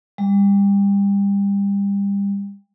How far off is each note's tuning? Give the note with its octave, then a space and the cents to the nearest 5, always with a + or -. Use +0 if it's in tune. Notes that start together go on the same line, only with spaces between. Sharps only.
G3 +30